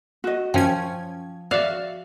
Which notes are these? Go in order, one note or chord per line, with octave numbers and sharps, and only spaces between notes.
F#4 D#5
F#2 F3 C#4 G5 G#6
F#4 D5 E5 F5